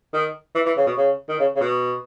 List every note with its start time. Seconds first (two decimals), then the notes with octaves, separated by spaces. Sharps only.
0.13 D#3
0.55 E3
0.66 E3
0.77 C#3
0.86 B2
0.97 C#3
1.29 D#3
1.39 C#3
1.56 C#3
1.61 B2